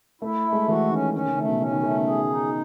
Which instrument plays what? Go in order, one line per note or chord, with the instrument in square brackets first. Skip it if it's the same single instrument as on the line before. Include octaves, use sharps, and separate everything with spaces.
[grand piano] A3 [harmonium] E4
[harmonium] A3
[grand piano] G#3
[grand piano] E3 [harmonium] F#4
[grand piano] D#3 [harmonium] C#4
[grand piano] D#3 [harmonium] C#4
[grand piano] C#3
[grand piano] D#3 [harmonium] A3
[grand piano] B2
[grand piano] C#3 [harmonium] C#4
[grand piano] D#3
[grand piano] C#3 [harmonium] A3
[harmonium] G#4
D#4